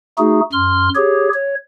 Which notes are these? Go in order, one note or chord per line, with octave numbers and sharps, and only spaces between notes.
A3 D#4 F#4 G#4
F#2 C6 F6
G4 G#4 C#5
C#5